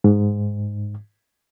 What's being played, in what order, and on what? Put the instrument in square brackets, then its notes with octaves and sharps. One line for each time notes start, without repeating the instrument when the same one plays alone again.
[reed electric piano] G#2